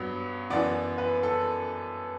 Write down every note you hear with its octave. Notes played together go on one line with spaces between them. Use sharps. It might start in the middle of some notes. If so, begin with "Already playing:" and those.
Already playing: G2 F#3 B3
F#2 E3 B3 D5
B4
A4